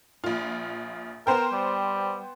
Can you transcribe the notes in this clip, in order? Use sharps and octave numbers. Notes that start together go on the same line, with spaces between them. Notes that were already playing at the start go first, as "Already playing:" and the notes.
A#1 F4
B3 A#4 C5 G5
G3